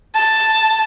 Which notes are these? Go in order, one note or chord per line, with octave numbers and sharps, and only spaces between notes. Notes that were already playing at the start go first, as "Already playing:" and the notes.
A5